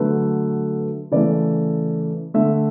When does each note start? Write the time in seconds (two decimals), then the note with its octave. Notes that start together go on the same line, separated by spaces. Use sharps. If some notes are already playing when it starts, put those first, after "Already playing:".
Already playing: D3 F#3 A3 B4
1.11 C#3 E3 A3 D5
2.34 D3 A3 E5